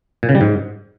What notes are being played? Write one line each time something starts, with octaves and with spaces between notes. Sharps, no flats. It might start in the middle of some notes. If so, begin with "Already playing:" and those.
A#2
C#3
G3
G#2